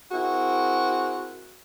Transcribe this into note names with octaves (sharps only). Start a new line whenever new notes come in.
C4 E4 F#4 G#4 A#4